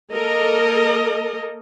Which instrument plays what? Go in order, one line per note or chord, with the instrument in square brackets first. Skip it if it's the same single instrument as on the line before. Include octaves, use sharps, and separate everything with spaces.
[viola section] A#3 A4 A#4 D#5